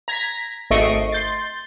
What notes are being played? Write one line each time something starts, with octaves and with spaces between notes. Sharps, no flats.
A#5 G#6 A#6 B6
G#1 A3 D#5 C#6 C7 D7
C6 G6 A6